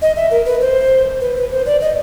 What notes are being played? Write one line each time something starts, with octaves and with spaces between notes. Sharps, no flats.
D#5
E5
A#4
B4
C5
B4
B4
C5
D5
D#5